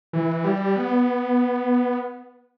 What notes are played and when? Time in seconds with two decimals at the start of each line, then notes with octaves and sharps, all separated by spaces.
0.13 E3
0.44 G3
0.76 B3